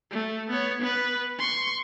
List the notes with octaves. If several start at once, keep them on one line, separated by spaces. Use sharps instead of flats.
A3
B3 C#5
B3 B4
C6 C#6